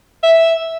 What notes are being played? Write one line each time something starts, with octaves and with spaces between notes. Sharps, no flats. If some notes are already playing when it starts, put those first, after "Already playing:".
E5